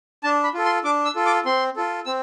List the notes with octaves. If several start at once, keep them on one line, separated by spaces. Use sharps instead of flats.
D4 A5
B5
F4 A4
C6
D4 D6
E6
F4 A4
D6
C4 C6
F4 A4
C4 E6